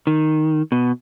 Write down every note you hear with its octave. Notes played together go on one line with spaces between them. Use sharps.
D#3
B2